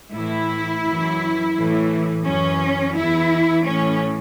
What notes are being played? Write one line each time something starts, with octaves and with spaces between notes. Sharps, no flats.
A2 E3 E4
F#2 E3
A2 E3
F#2 E3 C#4
E2 E3 E4
A2 E3 C#4